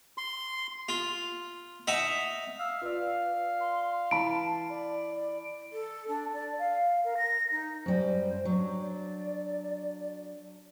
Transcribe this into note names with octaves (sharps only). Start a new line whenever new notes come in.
C6
F4
D#4 E5 F#5
F5 E6
F4 B4 D5
C6
E3 A5 B5 D7
D5
D5
A4
D4
D5
F5
A#4
A#6
D#4
F#2 G3 C5
F#3 D4
D5